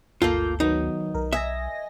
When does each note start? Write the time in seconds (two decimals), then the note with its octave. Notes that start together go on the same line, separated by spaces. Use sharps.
0.22 G1 D2 A#3 F4 A4 G6
0.60 D#3 F#3 B3 D#4
1.15 B1 A#4
1.33 D#5 E5 G#5 A#6